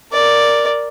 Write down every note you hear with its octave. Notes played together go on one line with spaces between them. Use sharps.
A#4 D5